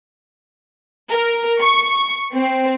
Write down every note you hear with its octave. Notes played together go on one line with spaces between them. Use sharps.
A#4
C#6
C4